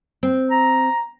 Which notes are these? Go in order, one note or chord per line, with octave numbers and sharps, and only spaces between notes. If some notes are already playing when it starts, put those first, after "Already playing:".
C4
A#5